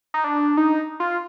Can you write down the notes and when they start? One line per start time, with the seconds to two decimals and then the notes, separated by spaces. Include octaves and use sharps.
0.14 D#4
0.24 D4
0.57 D#4
1.00 F4